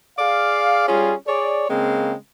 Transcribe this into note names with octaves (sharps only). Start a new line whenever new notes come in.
G#4 D5 F5
G3 C#4 F4 G#4
G#4 C#5 D5
C#3 G#3 A#3 C4